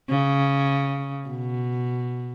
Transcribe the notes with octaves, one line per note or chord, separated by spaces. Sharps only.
C#3
B2